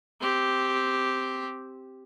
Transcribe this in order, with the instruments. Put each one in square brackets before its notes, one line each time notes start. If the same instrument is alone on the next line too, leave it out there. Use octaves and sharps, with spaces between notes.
[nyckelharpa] C4 G4